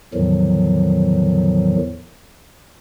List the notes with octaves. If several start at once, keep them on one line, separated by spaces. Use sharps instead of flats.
E2 A2 D3 D#3 F3 F#3